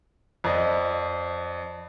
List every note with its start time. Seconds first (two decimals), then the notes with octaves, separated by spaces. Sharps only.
0.44 F2 D5 D#5